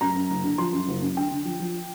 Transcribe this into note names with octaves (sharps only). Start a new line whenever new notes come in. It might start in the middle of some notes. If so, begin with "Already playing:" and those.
F#2 A#5
F#2
F#1
D3
F3 C6
F#2
F#1
F#2
D3 G5
D3
F3
F3